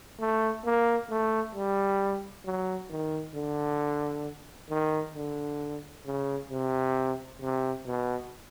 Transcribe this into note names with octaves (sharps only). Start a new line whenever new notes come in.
A3
A#3
A3
G3
F#3
D#3
D3
D#3
D3
C#3
C3
C3
B2